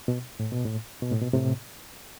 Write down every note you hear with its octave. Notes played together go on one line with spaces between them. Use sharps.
B2
A2
B2
A2
B2
A2
B2
A2 C3